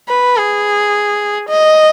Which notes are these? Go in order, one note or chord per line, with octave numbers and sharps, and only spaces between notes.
B4
G#4
D#5